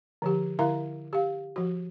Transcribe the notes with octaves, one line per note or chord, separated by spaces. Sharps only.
D3 F3 G4
D3 E4 A#4 E5 F5 A#5
G4 F5
F3 F#4